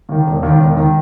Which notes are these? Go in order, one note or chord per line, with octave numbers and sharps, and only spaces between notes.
D#2 D#3
E1
D#2 D#3
E1
D#3